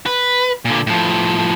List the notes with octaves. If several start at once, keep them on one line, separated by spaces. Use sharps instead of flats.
B4
A#2 D3
A2 F3